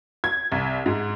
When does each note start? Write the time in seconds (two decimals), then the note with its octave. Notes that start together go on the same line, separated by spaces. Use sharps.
0.24 G#6
0.52 C2
0.86 G#2